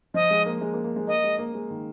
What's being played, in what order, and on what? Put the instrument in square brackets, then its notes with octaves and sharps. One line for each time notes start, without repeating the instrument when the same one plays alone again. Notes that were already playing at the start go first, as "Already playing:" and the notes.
[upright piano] F3 [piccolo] D#5
[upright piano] G#3
A#3
G#3
A#3
A#3
G#3
[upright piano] A#3 [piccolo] D#5
[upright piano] G#3
A#3
G#3
D#3